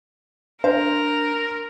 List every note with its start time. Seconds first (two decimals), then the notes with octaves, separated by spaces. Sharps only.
0.64 D4 A#4 C5